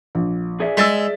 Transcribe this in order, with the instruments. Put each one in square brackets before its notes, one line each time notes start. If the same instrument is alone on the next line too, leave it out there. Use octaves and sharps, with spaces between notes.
[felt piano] A#1
[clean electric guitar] G#4 D5 E5
[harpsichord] G#3 [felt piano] E6 A6 B6